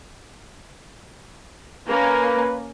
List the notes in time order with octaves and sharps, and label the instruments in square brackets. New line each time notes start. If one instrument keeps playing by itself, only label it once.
[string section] A#3 C#4 [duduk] B4